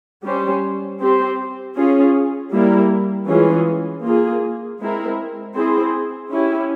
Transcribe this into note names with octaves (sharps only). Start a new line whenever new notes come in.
G3 C#4 G4 C5
C4 G4 C5
C#4 F4 G#4
G3 A#3 E4 A#4
E3 G#3 C#4 F4 G#4
A#3 F4 G#4
G#3 C4 E4 A#4
C4 E4 G#4 C5
C#4 E4 G4